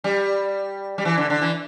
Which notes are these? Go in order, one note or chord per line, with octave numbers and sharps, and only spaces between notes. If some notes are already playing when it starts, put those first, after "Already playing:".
G3
G3
E3
D3
D3
E3